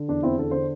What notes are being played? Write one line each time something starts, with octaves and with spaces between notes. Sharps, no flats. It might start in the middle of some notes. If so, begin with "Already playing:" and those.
Already playing: D3
E2 D4
E2 C4 E4
D3 A4
D3 C5